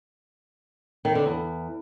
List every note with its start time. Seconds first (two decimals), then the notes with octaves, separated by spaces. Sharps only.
1.05 D#3
1.15 D3
1.26 E2